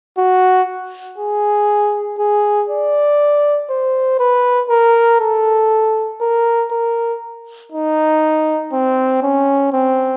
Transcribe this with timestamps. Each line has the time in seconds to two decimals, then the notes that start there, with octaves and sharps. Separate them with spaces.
0.17 F#4
1.18 G#4
2.18 G#4
2.69 D5
3.70 C5
4.19 B4
4.70 A#4
5.20 A4
6.21 A#4
6.71 A#4
7.72 D#4
8.72 C4
9.23 C#4
9.72 C4